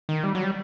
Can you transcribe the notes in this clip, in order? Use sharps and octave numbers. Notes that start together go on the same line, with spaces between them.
D#3
G3
F#3
G3